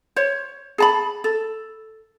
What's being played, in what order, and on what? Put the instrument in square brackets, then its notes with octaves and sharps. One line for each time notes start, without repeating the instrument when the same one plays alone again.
[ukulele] C5 C#5
G#4 A5 B5
A4